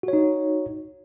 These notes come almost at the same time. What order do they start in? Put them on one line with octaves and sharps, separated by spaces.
F#4 C#5 D#4